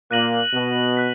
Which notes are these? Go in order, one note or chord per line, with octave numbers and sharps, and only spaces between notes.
A#2 A#3 F#6 A#6 D#7 F#7
B2 B3
F#6 B6